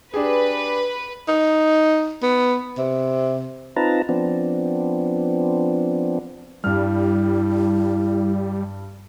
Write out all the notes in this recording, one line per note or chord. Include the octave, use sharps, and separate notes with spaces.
D4 G4 G#4 B4
D#4
B3
C3
C4 D#4 F4 B4 A5 A#5
F3 B3 C4 D4
G2 G3 E4 F6